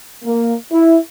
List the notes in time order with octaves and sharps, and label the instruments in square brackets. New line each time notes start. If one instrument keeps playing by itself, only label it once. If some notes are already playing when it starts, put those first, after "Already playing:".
[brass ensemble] A#3
E4